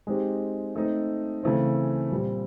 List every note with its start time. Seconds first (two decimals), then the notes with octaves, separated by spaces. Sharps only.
0.07 G#3 C4 D#4 G4
0.76 A3 C4 D#4
1.43 C#3 E3 A3 C4
2.12 A#2 G3 C4